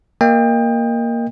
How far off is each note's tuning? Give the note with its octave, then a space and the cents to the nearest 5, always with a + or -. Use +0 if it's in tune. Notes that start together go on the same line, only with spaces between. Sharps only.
A#3 +0 D#5 +0 G5 +30